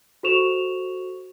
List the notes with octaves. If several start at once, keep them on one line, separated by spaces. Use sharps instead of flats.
F#4 A4 C5 C#6 E7 F7